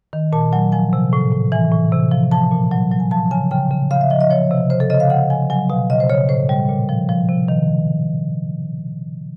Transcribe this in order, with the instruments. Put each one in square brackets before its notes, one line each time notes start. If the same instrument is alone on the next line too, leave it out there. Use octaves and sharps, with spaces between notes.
[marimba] D#3
A#2 A5
F#3 G#5
F3 G#5
C3
A2
A2
E3 G#5
A2
C3
F3
F3 A5
A#2
F#3
F#3
G#5
F3 A5
C#3 G#5
C#3 G5
C#3
C#3 F5
E5
F3 D#5
D#5
F3 C#5
C3
C#3 C5
A4
C#3 D#5
F5
C#3 F#5
F3 G#5
F#3 G#5
B2 F5
C#3 D#5
C5
C#3 C#5
A2 C5
G3
A#2
F3
F3
C3
D#3